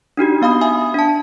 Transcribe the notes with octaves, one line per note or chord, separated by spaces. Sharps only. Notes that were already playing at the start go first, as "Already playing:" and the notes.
D4 D#4 F#4 G4
B3 F5 B5 D#6
E5 G#5 D#6
D4 A5